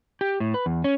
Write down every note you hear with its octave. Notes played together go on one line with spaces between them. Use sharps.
G4
A2
B4
E2
C#4